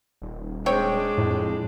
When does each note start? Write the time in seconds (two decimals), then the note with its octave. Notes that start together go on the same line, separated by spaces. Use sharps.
0.22 D#1
0.66 G#3 C4 D4 C#5 G5
1.18 F2 A2